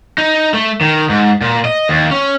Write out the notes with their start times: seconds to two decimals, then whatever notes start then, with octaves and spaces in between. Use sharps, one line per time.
0.18 D#4
0.54 A3
0.81 D#3
1.09 G#2
1.41 A#2
1.65 D#5
1.89 D#2
2.11 C#4